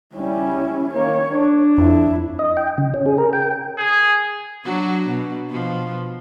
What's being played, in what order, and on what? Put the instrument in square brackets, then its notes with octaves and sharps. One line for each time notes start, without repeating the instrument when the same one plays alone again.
[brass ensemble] C#2 G3 [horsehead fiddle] C#4 E4
[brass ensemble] D#3 A#3 [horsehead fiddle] C#5
[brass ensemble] D4
[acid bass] F2 [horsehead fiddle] E4
[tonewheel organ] D#5
G5
C#3
C#4
G#4
A#4
G5
[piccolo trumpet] G#4
[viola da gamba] F#3 D4 F#4
B2
B2 F3